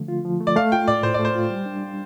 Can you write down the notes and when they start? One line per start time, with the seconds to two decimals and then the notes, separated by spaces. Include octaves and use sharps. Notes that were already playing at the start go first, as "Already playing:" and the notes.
Already playing: D3 F3 A3
0.08 F4
0.25 F3
0.41 A3
0.47 D5
0.56 A3 F5
0.72 F4 G5
0.88 A2 D5
1.03 A2 C5
1.14 D5
1.19 A3
1.25 C5
1.36 F4
1.50 G3
1.66 D4